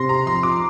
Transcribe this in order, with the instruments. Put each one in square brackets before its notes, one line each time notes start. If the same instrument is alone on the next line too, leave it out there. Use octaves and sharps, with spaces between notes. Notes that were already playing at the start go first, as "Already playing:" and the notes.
Already playing: [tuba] C3 [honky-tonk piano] C6 A#6
[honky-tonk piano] A#5
[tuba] F3 [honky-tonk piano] C6
[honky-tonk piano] D6